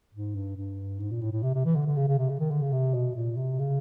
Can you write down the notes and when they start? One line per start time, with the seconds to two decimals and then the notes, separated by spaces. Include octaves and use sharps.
0.14 G#2
0.35 G2
0.56 G2
1.00 G#2
1.11 A#2
1.21 A2
1.32 A2
1.43 C3
1.54 C3
1.65 E3
1.76 D3
1.86 D3
1.96 C#3
2.08 C#3
2.18 C3
2.29 C#3
2.39 D#3
2.51 D3
2.61 C#3
2.72 C3
2.93 B2
3.15 A#2
3.37 C3
3.59 C#3